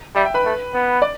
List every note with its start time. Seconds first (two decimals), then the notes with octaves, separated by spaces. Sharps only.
0.15 G3 E5
0.25 G5
0.34 B4 B5
0.45 A3
0.74 B3
1.02 D5 D6